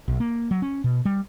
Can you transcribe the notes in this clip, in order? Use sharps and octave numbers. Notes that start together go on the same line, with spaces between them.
B1
A#3
F#3
C#4
B2
G3